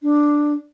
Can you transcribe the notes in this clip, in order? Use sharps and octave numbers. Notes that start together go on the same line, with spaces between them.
D4